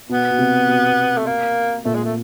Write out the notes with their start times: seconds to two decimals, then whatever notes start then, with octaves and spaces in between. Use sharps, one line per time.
0.09 B2 B3
0.31 B2
0.39 C3
0.68 B2
1.17 A3
1.26 A#3
1.85 A#2 A3
1.95 G#3
2.04 A3